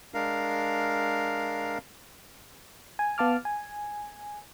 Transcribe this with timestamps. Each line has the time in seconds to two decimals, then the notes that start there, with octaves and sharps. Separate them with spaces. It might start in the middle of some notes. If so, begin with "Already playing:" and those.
0.14 G#3 D4 A#4 F5
2.99 G#5
3.18 B3 F5 A5 D6 F6
3.45 G#5